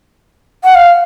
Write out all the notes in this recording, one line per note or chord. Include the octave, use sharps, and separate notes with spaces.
F#5
F5